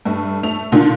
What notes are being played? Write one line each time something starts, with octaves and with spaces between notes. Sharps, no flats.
G2 A3
A3 F7
A#2 D3 D#3 D4 F4